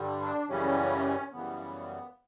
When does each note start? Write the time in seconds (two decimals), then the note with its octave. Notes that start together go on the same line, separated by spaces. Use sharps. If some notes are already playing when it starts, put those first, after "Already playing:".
Already playing: G2 D3 G3
0.20 D4
0.49 F#2 C#3 E3 G3 C#4
1.32 F#2 C#3 E3 G3 B3